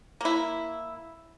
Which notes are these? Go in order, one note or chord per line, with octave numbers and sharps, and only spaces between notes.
A#3 E4